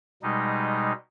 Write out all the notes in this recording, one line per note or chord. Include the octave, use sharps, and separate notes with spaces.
B2 G3 G#3 D#4